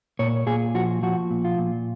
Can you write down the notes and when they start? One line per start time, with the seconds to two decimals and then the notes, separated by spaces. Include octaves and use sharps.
0.19 A#2 C#5
0.47 A#2 G#4
0.75 F3 F#4
1.02 F3 F#4
1.31 A#2
1.45 F4
1.58 A#2